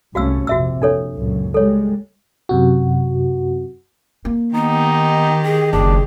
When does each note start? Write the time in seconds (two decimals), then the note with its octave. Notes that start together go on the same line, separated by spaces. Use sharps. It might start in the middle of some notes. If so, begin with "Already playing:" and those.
0.15 C2 A3 C#4 F#4 F5 E6
0.47 A#1 F2 C3 F#4 E5 E6
0.82 F2 D4 A4 C#5
1.15 C#2 F#2 A#2
1.54 G3 G#3 A4 C#5
2.49 F#2 C3 F#4
4.25 A#3
4.55 D#3 B3 D#4 G4
5.43 G#4
5.73 F#1 D4 G#4